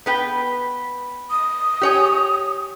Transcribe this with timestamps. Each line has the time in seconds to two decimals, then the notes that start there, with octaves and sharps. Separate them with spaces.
0.06 B3 B4 G5
1.31 D#6
1.81 G4 C#5 G#5